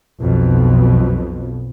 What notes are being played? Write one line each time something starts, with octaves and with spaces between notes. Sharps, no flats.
B1 F2 B2